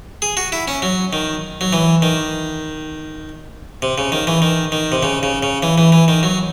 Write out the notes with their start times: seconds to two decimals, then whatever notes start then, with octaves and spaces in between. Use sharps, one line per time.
0.22 G#4
0.37 F#4
0.52 E4
0.68 C#4
0.82 F#3
1.13 D#3
1.61 F#3
1.73 E3
2.02 D#3
3.82 C3
3.98 C#3
4.12 D#3
4.27 E3
4.42 D#3
4.72 D#3
4.92 C3
5.03 C#3
5.23 C#3
5.43 C#3
5.63 E3
5.78 E3
5.92 E3
6.08 D#3
6.23 F#3